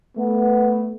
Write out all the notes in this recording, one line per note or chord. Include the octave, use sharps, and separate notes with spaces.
A3 B3